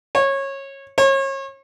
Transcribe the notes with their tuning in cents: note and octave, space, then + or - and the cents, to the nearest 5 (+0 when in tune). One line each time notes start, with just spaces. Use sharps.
C#5 -20
C#5 -35